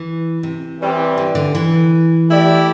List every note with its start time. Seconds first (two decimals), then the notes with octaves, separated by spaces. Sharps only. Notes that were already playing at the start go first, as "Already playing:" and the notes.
Already playing: E3
0.43 C3
0.79 E3 G3 C4 G4
1.18 D3
1.35 D3
1.55 E3
2.28 A3 E4 G4 D5